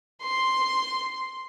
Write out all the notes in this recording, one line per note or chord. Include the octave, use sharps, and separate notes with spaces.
C6